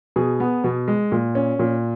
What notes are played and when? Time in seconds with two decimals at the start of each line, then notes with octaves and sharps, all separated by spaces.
0.16 B2 G#4
0.40 B3
0.64 B2
0.88 G#3
1.12 A#2
1.35 C#4
1.59 A#2